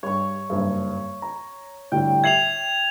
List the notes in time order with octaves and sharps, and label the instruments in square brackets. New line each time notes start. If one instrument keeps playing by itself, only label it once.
[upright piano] G2 [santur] C#5 C#6
[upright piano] F#1 G2
A#5
[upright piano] A2 D3 G3 [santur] G5
[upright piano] E5 C7 F#7 [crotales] G#6 F7